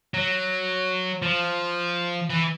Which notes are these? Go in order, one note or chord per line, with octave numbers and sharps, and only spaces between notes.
F#3
F3
E3